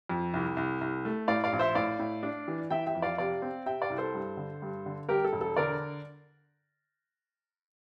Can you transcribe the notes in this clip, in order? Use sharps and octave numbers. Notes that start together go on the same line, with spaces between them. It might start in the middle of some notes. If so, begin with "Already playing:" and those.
F2
C2
C2
C2
A3
A2 D5 F5
D5 F5
A#1
C5 E5
A2 D5 F5
A2
D4
E3
E3 E5 G5
E5 G5
F2
D5 F5
C3 D5 F5
C4
C3 E5 G5
D5 F5
C2
A4 C5
G2
D3
G2
D3
G3 G4 A#4
A4
E1
A4
D3 A#4 D5